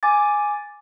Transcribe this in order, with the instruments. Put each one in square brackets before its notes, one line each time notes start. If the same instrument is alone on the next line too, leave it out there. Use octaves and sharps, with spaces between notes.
[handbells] G#5 D6 A6